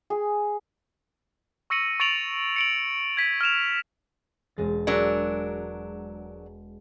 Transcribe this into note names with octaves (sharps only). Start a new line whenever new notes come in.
G#4
C#6 E6 A#6 C#7 D#7 F#7
C#6 A6 D7 F7 F#7
C#7 D7 F#7
G#6 B6 D#7
F6 G#6 E7 F7
E1 G#3 A6
F#3 D4 A#4 G#5 E6 F#6